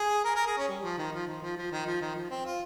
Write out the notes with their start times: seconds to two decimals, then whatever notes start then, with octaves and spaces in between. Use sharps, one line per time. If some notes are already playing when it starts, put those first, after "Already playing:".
Already playing: G#4
0.25 A#4
0.36 A#4
0.47 G#4
0.57 C#4
0.68 G3
0.83 F3
0.98 D#3
1.13 F3
1.27 D#3
1.43 F3
1.57 F3
1.72 D#3
1.86 F3
2.01 D#3
2.16 F3
2.30 C4
2.46 F4